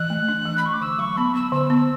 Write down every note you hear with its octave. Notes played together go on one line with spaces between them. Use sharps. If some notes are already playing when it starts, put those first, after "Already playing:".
Already playing: E3 F#6
A3
D4
E3
B5
A3 C#6
D6
D3 E6
F#3 C#6
B3 B5
B3 E6
D3 E6
B3